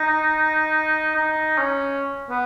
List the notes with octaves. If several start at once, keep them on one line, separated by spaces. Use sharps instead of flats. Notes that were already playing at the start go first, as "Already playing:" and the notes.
Already playing: D#4
D#4
C#4
B3